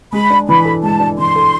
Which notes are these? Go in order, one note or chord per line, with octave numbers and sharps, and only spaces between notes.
G#3 B5
D4
E3 B5
A4
G#3 A5
D4
E3 C6
A4